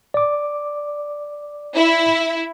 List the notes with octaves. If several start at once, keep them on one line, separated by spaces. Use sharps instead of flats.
D5 D6
E4